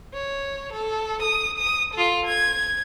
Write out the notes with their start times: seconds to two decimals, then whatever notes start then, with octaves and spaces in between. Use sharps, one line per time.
0.14 C#5
0.73 A4
1.22 D#6
1.58 D#6
1.94 F4 A4
2.25 G#6